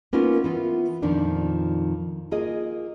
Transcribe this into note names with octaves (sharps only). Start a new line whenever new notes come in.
A#3 B3 C#4 D#4 F4 A#4
E3 B3 F4
F2 A#2 D#3 F3 D4
A#3 F4 G#4 D#5